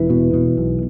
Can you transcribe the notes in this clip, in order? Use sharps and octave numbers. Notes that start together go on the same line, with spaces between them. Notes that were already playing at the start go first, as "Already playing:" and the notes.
Already playing: E1 E3
B2
B2
B1